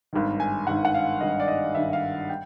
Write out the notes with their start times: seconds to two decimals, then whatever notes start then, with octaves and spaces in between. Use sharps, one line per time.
0.13 G#1 G2 D#3
0.40 G#5
0.67 G#1 G2 D#3 F#5
0.85 F#5
0.94 F5
1.21 G#1 G2 D#3 D#5
1.40 D5
1.48 D#5
1.75 G#1 G2 D#3 E5
1.93 F5
2.29 G5